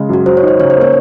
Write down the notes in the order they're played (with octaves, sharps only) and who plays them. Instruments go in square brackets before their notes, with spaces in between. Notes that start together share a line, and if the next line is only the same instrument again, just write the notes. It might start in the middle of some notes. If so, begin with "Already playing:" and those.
Already playing: [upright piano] C#3 G#3
[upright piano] F#2 [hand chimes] F#4
[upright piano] F#3 [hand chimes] C5
[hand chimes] C#5
[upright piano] D#4
[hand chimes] C5
[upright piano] C#3 [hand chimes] C#5
[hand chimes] C5
[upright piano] A#3 [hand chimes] C#5